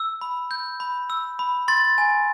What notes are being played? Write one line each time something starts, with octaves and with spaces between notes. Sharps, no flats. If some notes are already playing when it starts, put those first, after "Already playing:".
Already playing: E6
B5
G6
B5
E6
B5
C6 A6
G#5